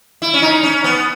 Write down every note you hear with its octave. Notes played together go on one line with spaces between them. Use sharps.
E4
C#4
D#4
C#4
B3